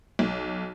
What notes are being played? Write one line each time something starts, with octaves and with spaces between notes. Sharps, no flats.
B1